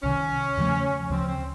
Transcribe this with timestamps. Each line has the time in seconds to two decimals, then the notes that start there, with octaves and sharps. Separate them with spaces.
0.03 C2 C3 D#3 C#4
0.57 E2 C#3 F3 A3
1.10 D2 C#3 F3 C4
1.28 C4